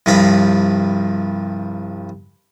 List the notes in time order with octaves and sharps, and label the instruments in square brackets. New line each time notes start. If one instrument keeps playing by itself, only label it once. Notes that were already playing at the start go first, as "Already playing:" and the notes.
[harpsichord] C2 G2 F3 F5 A#5 B5